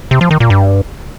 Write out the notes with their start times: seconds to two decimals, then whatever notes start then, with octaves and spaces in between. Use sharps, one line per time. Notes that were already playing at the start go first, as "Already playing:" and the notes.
0.11 C3
0.21 F3
0.31 D#3
0.40 A#2
0.50 G2